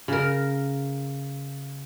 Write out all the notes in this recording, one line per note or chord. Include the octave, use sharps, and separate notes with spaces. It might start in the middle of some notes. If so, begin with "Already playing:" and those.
C#3 A#4